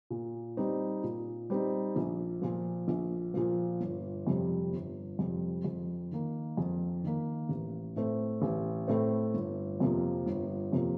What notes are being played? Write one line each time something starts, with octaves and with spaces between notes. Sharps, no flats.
A#2
G3 C4 D#4
A#2
G3 C4 D#4
A#1
A#2 F3
A#1
A#2 F3
G1
F2 C3 G3
G1
F2 C3 G3
F2
D#3 A#3
F2
D#3 A#3
A1
A2 A3 C4
A1
A2 A3 C4
G1
F2 C3 F3 A#3
G1
F2 C3 F3 A#3